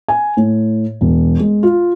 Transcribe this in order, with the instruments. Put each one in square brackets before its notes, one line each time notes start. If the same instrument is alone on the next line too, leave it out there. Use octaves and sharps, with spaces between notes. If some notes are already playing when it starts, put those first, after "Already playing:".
[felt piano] G#5
A2
E1
G#3
F4